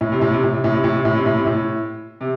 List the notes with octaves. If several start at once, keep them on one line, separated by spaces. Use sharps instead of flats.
A2
C3
A2
C3
A2
C3
A2
C3
A2
C3
A2
C3
A2
C3
A2
C3